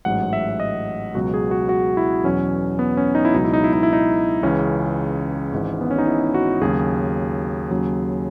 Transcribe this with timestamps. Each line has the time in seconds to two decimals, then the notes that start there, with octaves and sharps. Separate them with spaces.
0.05 A1 G#2 F#3 F#5
0.33 E5
0.60 D#5
1.15 C#2 B2 F#3 F#4
1.34 G#4
1.51 F#4
1.69 F#4
1.97 E4
2.24 E2 B2 F#3 C#4
2.79 B3
2.97 C#4
3.15 D#4
3.25 E4
3.34 C#2 B2 F#3 D#4
3.44 E4
3.53 D#4
3.64 E4
3.73 D#4
3.83 E4
3.93 D#4
4.43 C#2 C#3 E3 C#4
5.52 G#1 G#2 E3
5.81 B3
5.91 C#4
5.98 D#4
6.07 E4
6.34 F#4
6.61 D#2 C#3 F#3 G#4
7.71 D#2 C#3 F#3